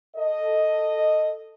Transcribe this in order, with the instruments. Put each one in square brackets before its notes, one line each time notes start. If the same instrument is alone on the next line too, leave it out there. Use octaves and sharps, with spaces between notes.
[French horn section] A4 D#5